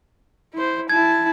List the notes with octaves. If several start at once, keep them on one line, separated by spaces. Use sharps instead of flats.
E4 C5
E4 A5 G#6